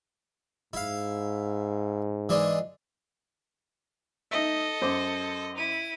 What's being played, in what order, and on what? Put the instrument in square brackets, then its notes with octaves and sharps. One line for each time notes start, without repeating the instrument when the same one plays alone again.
[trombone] G#2 [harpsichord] E4 F5
[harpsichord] E3 G#3 D4
[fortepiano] D#4 E5 [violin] A4 D#5
[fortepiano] F#2 C5 D6
[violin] E4 D#7